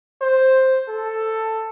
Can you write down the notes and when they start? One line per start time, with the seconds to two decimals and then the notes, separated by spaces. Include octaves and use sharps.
0.22 C5
0.89 A4